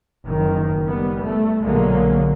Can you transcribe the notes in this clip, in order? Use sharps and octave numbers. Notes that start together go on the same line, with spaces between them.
F#1 D#3
G3 B3
A3
B1 A#2 D3 F#3 G#3 A#3